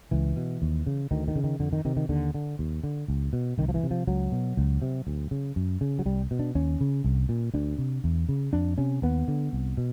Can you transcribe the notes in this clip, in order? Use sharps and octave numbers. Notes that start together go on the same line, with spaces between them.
C#2 E3
B2
D#2
C#3
D2 D#3
D#3
C#3
D#3
F2 D3
D#3
C3 D#3
D#3
D#2 D3
D3
D#2
D3
C#2
B2
C2 D#3
F3
E3
C3
F3
C#2 F#3
B2
C#2
C3
D2
C#3
F#2
C#3
F#3
C2 G3
B2
D4
D#2 C#4
C#3
C2
A#2
D2 D4
C3
E2
C#3
F2 D4
C3 C#4
D#2 B3
D3
C2
B2